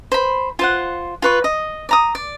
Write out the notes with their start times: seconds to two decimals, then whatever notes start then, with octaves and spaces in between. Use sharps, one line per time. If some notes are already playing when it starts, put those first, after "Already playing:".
0.12 C5 B5
0.59 F4 C5 F#5
1.22 F4 B4 C#6
1.44 D#5
1.89 D5 A#5 D#6
2.15 D5